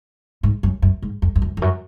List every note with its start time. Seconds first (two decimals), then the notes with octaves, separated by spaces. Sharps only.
0.43 G#2
0.63 F#2
0.82 F#2
1.02 G#2
1.22 F2
1.36 F2
1.42 F#2
1.57 F2
1.62 F#2